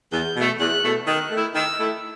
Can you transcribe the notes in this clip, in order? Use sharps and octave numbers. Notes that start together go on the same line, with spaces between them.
E2 G6
B2 A3
E2 F#6
B2 A3
D#3 F#6
A3 E4
D#3 E6
A3 E4